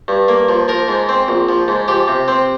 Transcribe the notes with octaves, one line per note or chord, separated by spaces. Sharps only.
G2
A#3
F3
F3 A#4
G#2
C4
A#1
F3
G#2
F3 G4
C3
C4